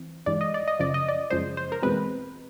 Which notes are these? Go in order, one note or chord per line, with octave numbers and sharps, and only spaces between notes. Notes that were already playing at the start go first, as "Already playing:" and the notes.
Already playing: E3 C4
G2 E3 G#3 D5
D#5
D5
D#5
F#2 C#3 F3 D5
D#5
D5
F#2 C#3 F3 G#3 C5
C5
A#4
E2 B2 G#3 C4 B4